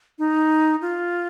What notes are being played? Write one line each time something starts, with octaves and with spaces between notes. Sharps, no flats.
D#4
F4